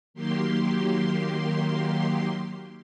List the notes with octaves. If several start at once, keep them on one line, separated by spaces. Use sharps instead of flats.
D#3 F#3 A#3 G4 C6